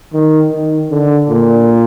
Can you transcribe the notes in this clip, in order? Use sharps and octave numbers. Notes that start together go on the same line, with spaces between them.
D#3
D#3
D3
A#2